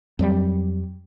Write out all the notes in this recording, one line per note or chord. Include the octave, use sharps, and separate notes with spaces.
F2 F#3 G3